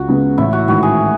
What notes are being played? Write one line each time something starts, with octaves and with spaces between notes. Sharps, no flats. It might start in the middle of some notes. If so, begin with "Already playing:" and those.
Already playing: C#2 F#4
C#3 G#3 B3
A1 E4
F#4
G#2 D#3 F#4
G#4